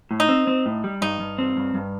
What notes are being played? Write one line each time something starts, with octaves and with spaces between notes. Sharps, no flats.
A2
D#4
C4
C4
A2
G3
G2 D#4
G2
C4
G2
G2